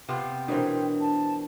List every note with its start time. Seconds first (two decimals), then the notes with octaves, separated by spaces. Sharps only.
0.09 C3 B3 F4 G5
0.48 B2 E3 D4 A#4 C5
1.01 A5